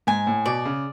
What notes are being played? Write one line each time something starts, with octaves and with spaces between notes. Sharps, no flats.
G#2 G#5
A2
B2 D5
C#3